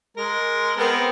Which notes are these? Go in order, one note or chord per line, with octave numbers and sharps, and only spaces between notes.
G#3 A#4
B3 C4 A#4